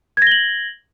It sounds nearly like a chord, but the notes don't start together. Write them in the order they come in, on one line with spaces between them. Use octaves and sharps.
G#6 A#6 G7 F#7